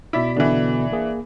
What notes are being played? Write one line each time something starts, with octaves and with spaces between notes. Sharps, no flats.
B2 E4 D5 B6
B2 D3 E3 B3 D4
A#3 G#4